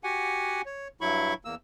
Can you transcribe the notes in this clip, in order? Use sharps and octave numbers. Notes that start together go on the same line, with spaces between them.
F#4 G4 F#5 G#5
C#5
G2 F#3 E4 B5 C#6
E2 A#3 E6